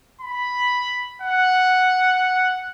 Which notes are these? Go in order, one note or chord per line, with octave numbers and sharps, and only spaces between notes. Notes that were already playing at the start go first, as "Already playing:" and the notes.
B5
F#5